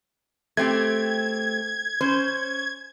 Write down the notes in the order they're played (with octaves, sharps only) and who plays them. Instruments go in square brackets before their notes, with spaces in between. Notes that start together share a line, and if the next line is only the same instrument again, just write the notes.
[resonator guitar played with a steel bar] A3 C4 G4 [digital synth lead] G#6
[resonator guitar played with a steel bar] C#4 C5